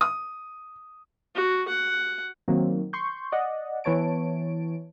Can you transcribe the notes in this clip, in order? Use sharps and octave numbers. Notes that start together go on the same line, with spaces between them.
D#6
F#4
F#5
D#3 F#3 A#3 C4
C6 C#6 G6
D5 D#5 F#5
E3 B3 C#5 A5 D7